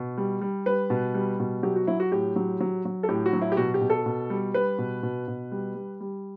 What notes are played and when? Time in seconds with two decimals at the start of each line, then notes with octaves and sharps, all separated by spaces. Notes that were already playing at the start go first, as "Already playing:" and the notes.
Already playing: B2
0.18 G3
0.41 G3
0.66 G3 B4
0.90 B2
1.14 G3
1.40 B2
1.63 F#3 G4
1.76 F#4
1.87 F#3 E4
2.00 F#4
2.12 A2 G4
2.36 F#3
2.60 F#3
2.85 F#3
3.03 A4
3.09 A2 G4
3.26 F#4
3.33 F#3
3.41 E4
3.52 G4
3.57 B2 F#4
3.74 G4
3.81 B2
3.90 A4
4.06 B2
4.30 G3
4.54 G3 B4
4.78 B2
5.03 B2
5.28 B2
5.52 G3
5.75 G3
6.01 G3